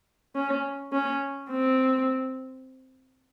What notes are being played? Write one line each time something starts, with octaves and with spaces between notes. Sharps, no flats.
C#4
C#4
C4